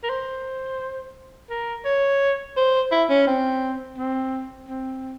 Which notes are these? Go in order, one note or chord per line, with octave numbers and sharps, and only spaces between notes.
A#4
C5
A#4
C#5
C5
E4
C#4
C4
C4
C4